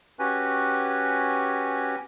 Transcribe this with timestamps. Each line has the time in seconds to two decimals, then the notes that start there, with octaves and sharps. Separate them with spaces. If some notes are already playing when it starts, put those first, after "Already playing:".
0.19 C#4 F#4 G4 B4 G#5